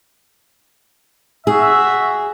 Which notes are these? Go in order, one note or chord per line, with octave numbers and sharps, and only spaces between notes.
F#4 G#4 E5